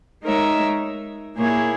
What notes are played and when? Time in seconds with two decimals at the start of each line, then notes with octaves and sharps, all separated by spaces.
0.23 G#3 D#4 A#4 C#5 E5
1.37 A#2 A#3 E4 G#4 C#5